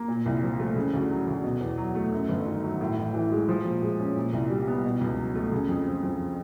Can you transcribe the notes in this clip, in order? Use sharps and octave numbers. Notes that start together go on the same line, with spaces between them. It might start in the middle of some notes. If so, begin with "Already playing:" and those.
Already playing: A#3
A#2
C2
F3
A3
C#3
D2
F#3
D2
B2
E2
F#3
A3
F#2
G1
D#3
F#3
A2
A1
E3
G#3
F3
A#2
G#3
C#4
A#2
C2
G3
B3
B2
C#2
F#3
A3
C#3
F2
F3
F2